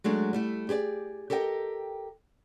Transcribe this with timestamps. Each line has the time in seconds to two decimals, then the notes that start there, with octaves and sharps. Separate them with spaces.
0.04 F#3 G#3 A3 D4
0.33 G3 A3 E4
0.69 G4 G#4 B4 D5
1.30 G4 A4 A#4 D#5 G5